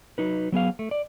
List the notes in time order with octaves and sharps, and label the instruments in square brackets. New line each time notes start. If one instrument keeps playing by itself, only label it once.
[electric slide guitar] F#3 D#4 B4
F#3 B3 G#4 F5
A3
D5